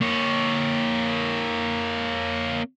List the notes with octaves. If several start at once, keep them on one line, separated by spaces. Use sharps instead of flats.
A#3 C#5